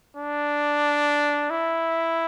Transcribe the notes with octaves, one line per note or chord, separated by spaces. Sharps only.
D4
E4